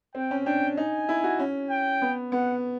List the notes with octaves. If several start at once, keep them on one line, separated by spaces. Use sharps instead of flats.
C4 G5
C#4
D4 G5
D#4 G#5
E4
F#4
C#4
G5
B3
B3 F#5